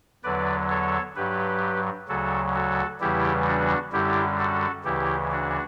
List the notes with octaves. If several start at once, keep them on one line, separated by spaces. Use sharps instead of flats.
E2 D3 F#3 B4 D5
A4 C#5
G2 F#3 G4 B4
D2 C#3 F#3 F#4 A4
F#4 A4
E2 C#3 E3 G3 E4 G4
D4 F#4
F#2 D3 G3 E4 G4
F#4 A4
D2 C#3 E3 E4 G4
D4 F#4